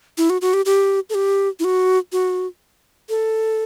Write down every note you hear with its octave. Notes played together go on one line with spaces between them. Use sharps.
E4
F#4
F#4
G4
G4
A4
G4
E4
F#4
F#4
A4